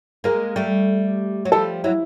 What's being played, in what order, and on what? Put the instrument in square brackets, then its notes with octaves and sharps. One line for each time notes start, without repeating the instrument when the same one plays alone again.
[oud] G#3 A#3 [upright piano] A#4
[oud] G3 A3
F#3
[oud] F3 G3 [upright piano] A4
[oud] F#3 [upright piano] E4